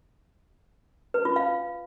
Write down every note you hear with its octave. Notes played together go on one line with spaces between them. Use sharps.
B4
F4
F5